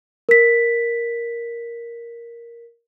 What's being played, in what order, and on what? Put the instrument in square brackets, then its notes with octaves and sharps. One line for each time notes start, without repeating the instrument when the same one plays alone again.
[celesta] A#4 B6